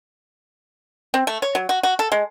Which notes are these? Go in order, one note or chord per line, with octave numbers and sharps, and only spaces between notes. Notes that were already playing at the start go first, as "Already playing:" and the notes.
C4
A3
C#5
F#3
F#4
F#4
A4
G#3